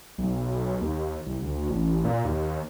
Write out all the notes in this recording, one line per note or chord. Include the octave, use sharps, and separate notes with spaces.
B1
D#2
C2
D2
A1
A#2
D#2